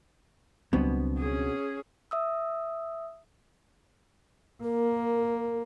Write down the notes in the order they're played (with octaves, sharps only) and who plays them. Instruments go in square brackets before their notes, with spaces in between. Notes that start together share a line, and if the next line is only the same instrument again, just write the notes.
[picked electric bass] C#2 F#3 G3 [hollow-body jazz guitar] B2 B3 [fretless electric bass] C4 D4
[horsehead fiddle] C#4 G#4
[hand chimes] E5 D#6 E6
[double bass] A#3 [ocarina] A#4